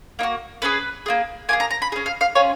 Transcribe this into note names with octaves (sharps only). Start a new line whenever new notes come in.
A#3 D#4 F#4
C#4 F4 G#4 B4
A#3 F4 G#4
A#3 F4 G#4 G#5
A#5
A#5
B5
C#4 G#4
F5
F5
C#4 F4 G#4 C#5